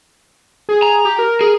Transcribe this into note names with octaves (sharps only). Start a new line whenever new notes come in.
G#4
A#5
G4
A#4
G#4